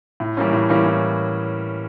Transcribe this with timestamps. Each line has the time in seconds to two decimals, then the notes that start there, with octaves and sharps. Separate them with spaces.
0.20 A2
0.37 E3 G3 A#3 C#4
0.53 A2
0.69 E3 G3 A#3 C#4
0.85 A2